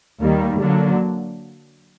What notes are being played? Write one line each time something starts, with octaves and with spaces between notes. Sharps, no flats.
D#2 D#3 G3 A#3
D3 F#3 A#3 D4